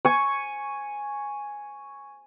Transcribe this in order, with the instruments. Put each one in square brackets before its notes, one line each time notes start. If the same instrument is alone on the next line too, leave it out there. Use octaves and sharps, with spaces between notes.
[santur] G#5 C#6